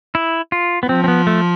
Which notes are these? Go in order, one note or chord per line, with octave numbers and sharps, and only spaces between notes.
E4
F4
B3
F3 C4
C4
B3
A3